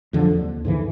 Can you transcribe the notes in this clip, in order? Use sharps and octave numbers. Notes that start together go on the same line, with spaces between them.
F2 D3 F3 F#3
D#2
G#2 D3 E3